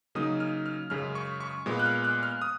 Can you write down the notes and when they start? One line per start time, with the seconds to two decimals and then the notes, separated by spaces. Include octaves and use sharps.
0.15 C#3 F#3 A#3 D#4 D#6
0.40 F6
0.66 F6
0.90 F#2 C#3 G#3 F6
1.15 C#6
1.40 C#6
1.66 A#2 G#3 B3
1.79 F#6
1.86 F6
2.04 F#6
2.23 F6
2.42 D#6